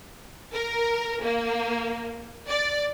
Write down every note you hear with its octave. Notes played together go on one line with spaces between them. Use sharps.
A#4
A#3
D5